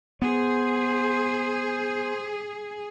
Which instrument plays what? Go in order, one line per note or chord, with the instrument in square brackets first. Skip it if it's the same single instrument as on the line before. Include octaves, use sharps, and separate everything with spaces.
[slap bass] B3 [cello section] G#4 [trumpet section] C5